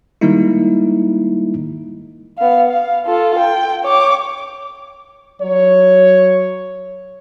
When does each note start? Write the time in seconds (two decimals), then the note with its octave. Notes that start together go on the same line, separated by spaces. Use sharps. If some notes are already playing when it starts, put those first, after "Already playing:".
0.21 D#3 G3 G#3 A#3 D#4 E4
2.39 B3 F5
2.69 F5
3.07 F4 A4
3.39 G5
3.84 C#5 D6
5.41 F#3 C#5